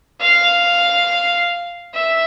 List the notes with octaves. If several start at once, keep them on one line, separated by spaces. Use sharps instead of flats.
F5
E5